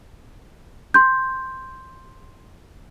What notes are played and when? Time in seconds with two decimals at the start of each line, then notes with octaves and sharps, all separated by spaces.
0.94 C6 G6